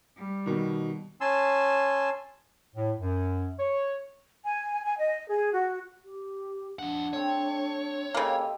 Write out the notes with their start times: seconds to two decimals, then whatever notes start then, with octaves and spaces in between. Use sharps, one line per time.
0.16 G3
0.46 B2 D#3
1.21 C#4 G#5 A5 C6 E6
2.76 A2
3.00 F#2
3.59 C#5
4.44 G#5
4.84 G#5
4.99 D#5
5.29 G#4
5.53 F#4
6.05 G4
6.79 F2 D4 F#5
7.13 A3 C4 C#5
8.14 C#3 A#3 G4 A4 D#5